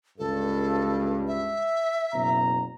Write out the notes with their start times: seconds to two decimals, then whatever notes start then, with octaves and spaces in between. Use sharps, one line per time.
0.18 C#2 G2 A4
1.27 E5
2.13 F#1 B2 A#5